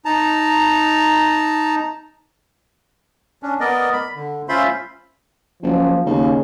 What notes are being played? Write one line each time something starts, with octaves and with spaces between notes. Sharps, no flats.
D#4 A5 A#5
C#4 D4
B3 A#4 D5 D#5
B5
D3
C#4 F4 C5 E5 B5 C6
F#1 F3
D#2 C#3